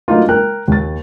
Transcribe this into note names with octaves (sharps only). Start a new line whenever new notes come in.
F#3 A3 A#3 D4 D#4 F4
A#4 G5 F#6
D#2 A6